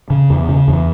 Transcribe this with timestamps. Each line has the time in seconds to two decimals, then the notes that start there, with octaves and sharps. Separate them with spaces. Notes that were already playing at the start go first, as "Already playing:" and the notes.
0.10 C#3
0.30 E2
0.49 C#3
0.68 E2